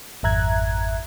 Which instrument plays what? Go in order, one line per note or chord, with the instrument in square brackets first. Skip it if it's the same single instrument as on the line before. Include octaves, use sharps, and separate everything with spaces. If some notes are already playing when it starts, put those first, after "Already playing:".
[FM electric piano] G#1 F2 E5 A#5 F#6 G#6